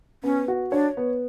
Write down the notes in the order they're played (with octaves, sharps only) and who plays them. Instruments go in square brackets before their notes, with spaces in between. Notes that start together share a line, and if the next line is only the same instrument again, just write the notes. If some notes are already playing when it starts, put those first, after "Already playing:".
[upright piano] B3 [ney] C#4
[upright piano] F#4
[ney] D4 [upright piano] C#5
[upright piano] B3